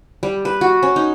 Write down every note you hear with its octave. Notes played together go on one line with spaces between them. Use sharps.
G3
B4
F#4
C#4
D#4